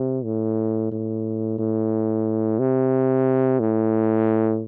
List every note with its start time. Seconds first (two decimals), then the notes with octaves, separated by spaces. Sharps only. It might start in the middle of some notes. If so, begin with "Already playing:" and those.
Already playing: C3
0.24 A2
0.92 A2
1.59 A2
2.59 C3
3.60 A2